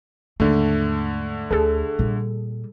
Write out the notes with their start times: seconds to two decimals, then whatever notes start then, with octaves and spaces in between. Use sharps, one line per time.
0.40 D#2 G#2 D3 A3
1.51 D2 G#4 A4
1.99 A#2 G3